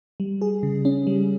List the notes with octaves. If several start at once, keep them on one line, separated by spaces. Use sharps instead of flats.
G3
G#4
C#3
C#4
G3